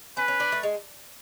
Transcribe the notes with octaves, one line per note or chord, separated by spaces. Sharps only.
C#4 B4
C#4
D4
A3
G#3